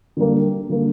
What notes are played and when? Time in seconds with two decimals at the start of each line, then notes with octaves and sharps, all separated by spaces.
0.17 D3 G3 A#3
0.69 D3 G3 A#3